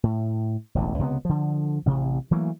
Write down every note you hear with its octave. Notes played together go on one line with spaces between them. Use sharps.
A2
E1 A1 D2
C#2 C3 E3 B3
D3 F3
A1 C3
E3 F#3 A3 A#3